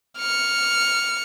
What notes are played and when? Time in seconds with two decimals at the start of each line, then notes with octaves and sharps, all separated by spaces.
0.18 F6 C#7